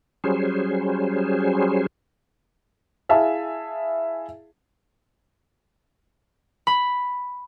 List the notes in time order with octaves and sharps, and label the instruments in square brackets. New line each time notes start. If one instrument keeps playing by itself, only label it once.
[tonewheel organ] F#3 G3 C#4 G#4 C5
[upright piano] E4 G#4 E5 F5 G#5 A5
[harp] B5